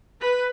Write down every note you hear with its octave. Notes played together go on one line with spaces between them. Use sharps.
B4